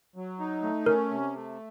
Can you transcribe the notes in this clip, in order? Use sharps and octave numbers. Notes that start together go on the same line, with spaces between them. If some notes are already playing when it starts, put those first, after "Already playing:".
F#3
D#4
A3
C#4 A#4
C3
A3